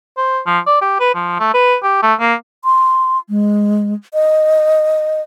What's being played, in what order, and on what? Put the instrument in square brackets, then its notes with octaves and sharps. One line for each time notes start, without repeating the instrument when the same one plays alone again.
[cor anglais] C5
F3
D5
G4
B4
F3
A3
B4
G4
A3
A#3
[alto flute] C6
G#3
D#5